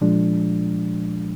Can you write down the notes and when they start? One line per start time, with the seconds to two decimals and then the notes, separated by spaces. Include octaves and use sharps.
0.01 A#2 F3 G#3 D4